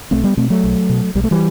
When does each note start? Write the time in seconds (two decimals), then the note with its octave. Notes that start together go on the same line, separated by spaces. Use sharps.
0.11 B1 A3 C4
0.24 G3 B3
0.37 B2 A3 C4
0.50 F#3 A3
0.63 B1
0.89 B2
1.15 B1 G3
1.24 A3
1.31 E3 G3